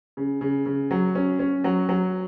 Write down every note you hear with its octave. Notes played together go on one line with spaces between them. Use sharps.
C#3
C#3
C#3
F#3
C#4
C#4
F#3
F#3